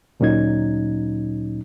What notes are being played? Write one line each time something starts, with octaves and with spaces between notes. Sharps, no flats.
D2 A#2 F#3 C#4 D#4 G#6